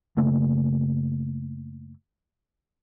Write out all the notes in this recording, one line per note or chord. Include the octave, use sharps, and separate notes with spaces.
F#1 C#3 A3 A#3